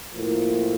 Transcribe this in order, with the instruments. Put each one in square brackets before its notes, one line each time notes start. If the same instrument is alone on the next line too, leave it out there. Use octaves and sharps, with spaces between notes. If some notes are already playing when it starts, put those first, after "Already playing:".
[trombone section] A2 F3 A#3